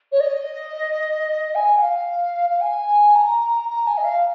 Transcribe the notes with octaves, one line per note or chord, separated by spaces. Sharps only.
C#5
D#5
G#5
F5
F5
G#5
A#5
A#5
G#5
D#5
F5